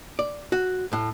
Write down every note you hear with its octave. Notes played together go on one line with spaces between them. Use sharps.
D5
F#4
A2